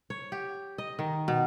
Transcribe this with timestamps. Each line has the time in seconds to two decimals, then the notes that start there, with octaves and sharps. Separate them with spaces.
0.10 C#5
0.32 G4
0.78 D#5
0.99 D#3
1.28 B2